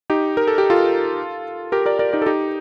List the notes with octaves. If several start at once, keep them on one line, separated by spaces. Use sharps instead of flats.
D#4 G4
A#4
A4
G4
F4 A4
G4 A#4
A#4 D5
A#4 D5
D#4 G4
A4
D#4 G4